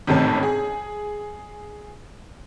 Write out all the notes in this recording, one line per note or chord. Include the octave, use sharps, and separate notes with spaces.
G#1 A2 C3 D#3 C#4 A5
G#4